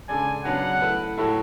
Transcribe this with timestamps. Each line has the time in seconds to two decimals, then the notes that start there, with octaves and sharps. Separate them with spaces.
0.09 C#3 G#3 D4 A4 D5 G#5
0.44 C#3 F#3 B3 D4 F#5
0.81 A3 E4 B4
1.17 A2 F#3 A3 E4 A4